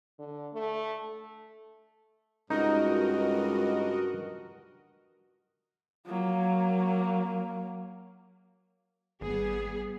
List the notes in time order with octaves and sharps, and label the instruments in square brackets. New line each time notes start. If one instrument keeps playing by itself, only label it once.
[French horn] D3
A3
[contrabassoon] C#2 [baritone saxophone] G2 [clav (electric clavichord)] D#4 [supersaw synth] F#4 A#4 D#5
[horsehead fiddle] F#3 A#3
[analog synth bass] G#1 [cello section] G3 B3 G#4